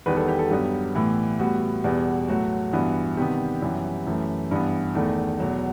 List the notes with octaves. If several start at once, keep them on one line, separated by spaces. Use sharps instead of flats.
E2 D#3 G3 B3 B4
A4
G4
A4
G2 F#3 B3 G4
A2 E3 B3
A2 G3 B3 F#4
E2 B2 G3 B3
A2 F#3 A3 F#4
G2 E3 B3
C3 D#3 G3 B3 G4
F#2 E3 G3 B3
F#2 E3 A3
G2 E3 B3
E2 D#3 A3 A4
E2 B2 F#3